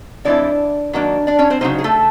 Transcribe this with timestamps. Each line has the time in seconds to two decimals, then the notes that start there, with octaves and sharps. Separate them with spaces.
0.25 E3 G#3 C4 D4 E4 D5
0.93 D#3 F#3 A#3 D4
1.27 D4 D5
1.39 C#4 C#5
1.50 C4 C5
1.61 C#3 F#3 A#3 C4 D#4 C5
1.78 G#4
1.84 A3 A4